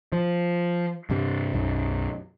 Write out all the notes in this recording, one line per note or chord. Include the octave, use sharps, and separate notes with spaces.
F3
G2 C3 G3
B1 F#2